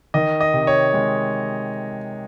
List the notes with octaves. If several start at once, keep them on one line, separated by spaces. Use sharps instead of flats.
D#3 D#5
D#5
C3
C#5
G#3